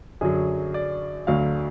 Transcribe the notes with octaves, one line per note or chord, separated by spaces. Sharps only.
F#2 D3 F#3 G#4
D5
D2 D3 F#3 F5